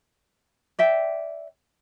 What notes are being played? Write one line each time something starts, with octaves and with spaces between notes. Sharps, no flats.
D5 E5 G5